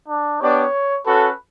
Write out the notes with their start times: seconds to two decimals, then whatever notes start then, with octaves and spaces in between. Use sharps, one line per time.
0.08 D4
0.41 B3 D4 G4 C#5 D5
1.06 C#4 F#4 A4 B4